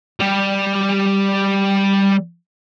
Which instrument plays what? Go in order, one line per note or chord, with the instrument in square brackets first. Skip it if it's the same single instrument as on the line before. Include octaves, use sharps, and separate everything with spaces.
[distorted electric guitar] G3 G4